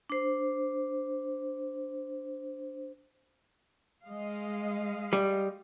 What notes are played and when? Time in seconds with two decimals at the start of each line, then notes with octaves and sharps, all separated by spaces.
0.10 D4 C5
4.04 G#3 D#5 F5
5.13 G3